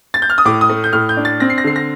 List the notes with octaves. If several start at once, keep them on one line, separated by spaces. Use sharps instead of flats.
A6
G6
F6
D#6
A2 D6
D#6
A3
G6
A2 F6
G6
D4
A6
C4 A#6
C7
A#6
D3 C7
A#6